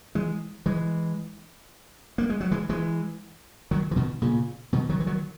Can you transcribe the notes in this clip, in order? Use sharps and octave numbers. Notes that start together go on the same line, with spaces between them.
E3 G#3
E3 G#3
A#3
G#3
F#3
E3 G#3
E3 G#3
D#3 F#3
E3
B2 D#3
A#2 C#3
B2 D#3
D#3 F#3
E3
D#3 F#3